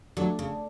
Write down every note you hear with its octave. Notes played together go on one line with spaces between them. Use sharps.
F#3 A3 D4 A4 D5
C#3